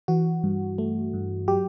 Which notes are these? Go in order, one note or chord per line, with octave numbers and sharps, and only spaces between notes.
E3 F#4
G2
A3
G2
F#3 G4